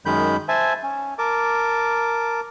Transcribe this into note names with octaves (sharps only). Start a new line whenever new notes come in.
F#2 D#3 G#3 B5 G6
C5 E5 G#5 A5
C#4
A#4 A5 D6